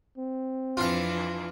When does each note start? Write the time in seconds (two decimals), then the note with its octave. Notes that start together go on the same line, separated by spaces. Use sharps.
0.17 C4
0.77 F2 E3 D4 F4 F5